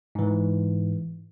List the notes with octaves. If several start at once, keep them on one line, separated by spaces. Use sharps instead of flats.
G#2 E3